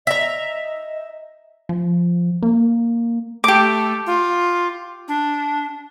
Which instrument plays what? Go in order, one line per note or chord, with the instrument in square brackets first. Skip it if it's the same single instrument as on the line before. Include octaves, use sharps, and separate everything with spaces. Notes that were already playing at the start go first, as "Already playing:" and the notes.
[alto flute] D#5 [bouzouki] E5 A#5
[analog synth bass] F3
A#3
[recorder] A3 [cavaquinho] G4 D6
[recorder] F4
D4